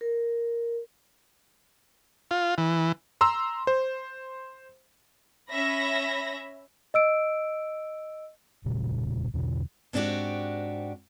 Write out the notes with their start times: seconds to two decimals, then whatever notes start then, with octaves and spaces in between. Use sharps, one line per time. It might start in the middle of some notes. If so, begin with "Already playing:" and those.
0.01 A#4
2.31 F4
2.58 E3
3.21 A#5 C6 E6
3.67 C5
5.50 C#4 E5 B5 A#6
6.94 D#5 E6 D7
8.65 E1 A#2 C#3 G3
9.34 E2 B2 D3
9.93 G#2 C4 D4 D#4 F#4 G4